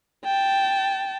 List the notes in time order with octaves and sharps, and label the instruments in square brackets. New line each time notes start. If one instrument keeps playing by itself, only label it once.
[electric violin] G5 A5